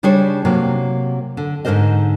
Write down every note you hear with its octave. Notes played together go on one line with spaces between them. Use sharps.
C#3 G3 D4 G#4 C5 C#5
C3 F#3 A#3
D3
G#2 D3 F3 A#4 C5 D#5